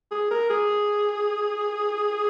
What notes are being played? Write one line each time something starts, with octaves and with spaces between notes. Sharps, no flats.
G#4
A#4
G#4